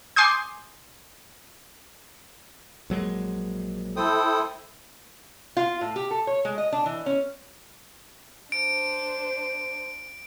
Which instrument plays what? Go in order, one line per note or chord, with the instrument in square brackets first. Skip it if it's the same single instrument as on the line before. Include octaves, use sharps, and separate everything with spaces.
[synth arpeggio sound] G#5 C6 D6 D#6 G6
[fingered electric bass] A#1 F#3 G#3
[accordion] E4 A4 [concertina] C5 G5 D#6
[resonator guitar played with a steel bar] F4
A2
G4
A4
C#5
G#3
D#5
D4
E3
C#4
[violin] D4 C5 [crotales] D7